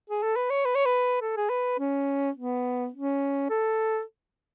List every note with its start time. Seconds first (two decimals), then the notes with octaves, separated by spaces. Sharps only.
0.10 G#4
0.23 A4
0.36 B4
0.50 C#5
0.65 B4
0.75 C#5
0.86 B4
1.22 A4
1.37 G#4
1.50 B4
1.79 C#4
2.36 B3
2.94 C#4
3.50 A4